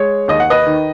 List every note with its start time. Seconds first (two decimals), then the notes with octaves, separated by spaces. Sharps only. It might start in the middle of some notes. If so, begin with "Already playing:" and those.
Already playing: G#3 C#5
0.28 D#2 D#5
0.40 F#5
0.50 B4 D#5
0.66 D#3